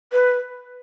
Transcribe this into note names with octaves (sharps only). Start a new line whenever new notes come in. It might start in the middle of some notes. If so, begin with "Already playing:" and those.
B4